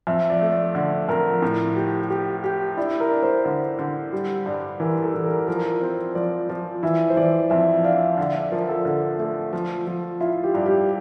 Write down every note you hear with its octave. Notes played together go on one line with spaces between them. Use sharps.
F2 E5
D5
A3
D5
D3
F2 A#4
A2
G4
G4
G4
D4 E4
A#4
D4
C5
D3
D3
G3
G2
E3 A#4
A4
E3
A#4
F3 A#4
C4
F3 D5
F3 D5
E3 E5
C5
E3 D5
F2 E5
D4 F5
D3 E5
D5
F3 A#4
A4
D3
A3
F3
F3
E4 F4
G4
G2
G4